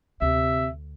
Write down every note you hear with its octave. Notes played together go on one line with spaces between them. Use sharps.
D2 C3 E5